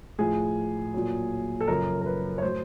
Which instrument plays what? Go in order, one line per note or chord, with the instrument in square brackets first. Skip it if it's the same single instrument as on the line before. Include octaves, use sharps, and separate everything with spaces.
[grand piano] A2 F3 G#4
A#2 F#3
A4
F#2 C#3 F3 A#4
A#4
B4
C#5
A2 F#3 C5